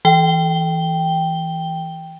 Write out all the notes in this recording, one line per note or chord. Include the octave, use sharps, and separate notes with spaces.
E3 G5 G7